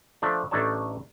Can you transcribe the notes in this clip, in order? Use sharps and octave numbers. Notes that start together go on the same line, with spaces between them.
F3 A3 D4
A1 A3 D4 D#4 C#5 A5